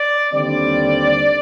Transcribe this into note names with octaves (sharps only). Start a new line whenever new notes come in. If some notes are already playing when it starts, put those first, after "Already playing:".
Already playing: D5
D#2 D3 G3 C4 D5